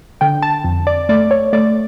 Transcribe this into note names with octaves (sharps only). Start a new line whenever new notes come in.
D3 G5
A5
F2
D5
A3 D5
C#5
A3 D5